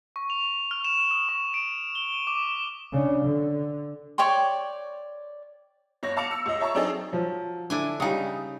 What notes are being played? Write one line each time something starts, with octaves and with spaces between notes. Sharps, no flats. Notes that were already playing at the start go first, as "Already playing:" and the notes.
C#6
F7
F6
E7
D#6
C#6
D7
G7
D#7
D6
C#3 D4
D3
C#5 D5 G5 C6
G1 C#5 A#6
F5 A5 D6 C#7 F7
E6
C#2 D#5
C#5 E5 A5 A#5 C#6 E6
F#3 C4 D4 D#4 G#4 A4
F3 F#3
D3 D4 E4 G#5
C#3 G3 D#4 G5 D#6